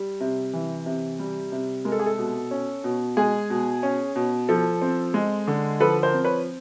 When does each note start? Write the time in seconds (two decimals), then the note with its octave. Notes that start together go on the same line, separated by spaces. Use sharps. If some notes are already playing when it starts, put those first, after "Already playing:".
Already playing: G3
0.20 C3
0.53 E3
0.86 C3
1.19 G3
1.52 C3
1.85 G#3 A#4
1.92 A4
1.99 G#4
2.06 A4
2.18 B2
2.51 C#4
2.84 B2
3.17 G#3 G#4
3.50 B2
3.83 C#4
4.16 B2
4.49 F3 A4
4.82 C4
5.14 G#3
5.48 D3
5.80 F3 A4 B4
6.02 A#4 C5
6.13 C4
6.24 B4 C#5